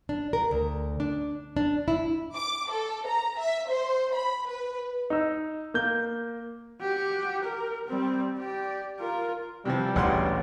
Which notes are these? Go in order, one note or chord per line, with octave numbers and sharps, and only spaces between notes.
D4
A#4
D2
D4
D4
E4
D6
A4
A#5
E5
C5
B5
B4
D#4 E6
A#3 G6
F#4 G4
A#4
G3 C4
G4 D5
F4 A#4
C3 E3 F3 G3
A1 D2 A#2 G#4 F#5 C6